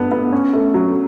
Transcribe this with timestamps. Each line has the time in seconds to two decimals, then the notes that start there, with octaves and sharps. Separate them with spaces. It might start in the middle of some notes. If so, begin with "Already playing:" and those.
Already playing: G2 B3
0.11 B3
0.33 C#4
0.53 A3
0.74 F#3